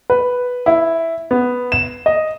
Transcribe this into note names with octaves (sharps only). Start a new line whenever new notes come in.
B4
E4
B3
E7
D#5